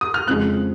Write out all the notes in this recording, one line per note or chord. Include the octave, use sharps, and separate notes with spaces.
D#6
F6
F2 C#3 F3 G#3 F#6